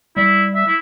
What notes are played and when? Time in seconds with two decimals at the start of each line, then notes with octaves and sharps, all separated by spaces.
0.17 G3 E4
0.55 E5
0.68 E4